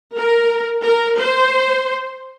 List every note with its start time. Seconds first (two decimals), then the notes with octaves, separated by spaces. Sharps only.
0.16 A#4
0.85 A#4
1.20 C5